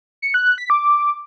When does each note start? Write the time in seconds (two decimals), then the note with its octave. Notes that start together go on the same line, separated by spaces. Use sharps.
0.22 C#7
0.34 F#6
0.46 F#6
0.58 B6
0.70 D6